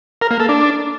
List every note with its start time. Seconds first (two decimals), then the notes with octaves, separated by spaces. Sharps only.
0.21 A#4
0.31 A#3
0.40 A4
0.49 D4